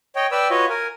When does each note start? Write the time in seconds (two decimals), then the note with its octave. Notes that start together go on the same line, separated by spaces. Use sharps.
0.16 C#5 D#5 G5
0.31 B4 D5 G5 B5 E6
0.50 F4 F#4 B4 C#5 D#5
0.69 A#4 G#5